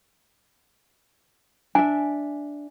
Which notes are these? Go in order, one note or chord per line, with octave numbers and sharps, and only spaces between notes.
D4 E5 G#5